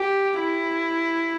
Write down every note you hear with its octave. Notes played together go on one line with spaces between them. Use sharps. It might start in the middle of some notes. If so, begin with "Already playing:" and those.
Already playing: G4
E4